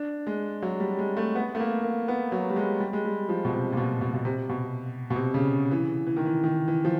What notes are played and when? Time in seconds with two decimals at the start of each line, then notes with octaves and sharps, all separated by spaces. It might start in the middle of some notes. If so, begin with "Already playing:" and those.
Already playing: D4
0.27 G#3
0.62 F#3
0.80 G3
0.99 G#3
1.17 A3
1.35 B3
1.55 A3
1.60 A#3
1.83 A#3
2.08 B3
2.32 F#3
2.50 G3
2.56 G#3
2.80 G3
2.93 G#3
3.05 G3
3.29 F3
3.45 B2
3.53 C3
3.72 A#2
3.77 B2
4.01 B2
4.14 B2
4.25 C3
4.49 B2
5.10 B2
5.16 C3
5.34 C#3
5.71 E3
6.07 E3
6.16 D#3
6.25 E3
6.44 D#3
6.68 E3
6.85 F3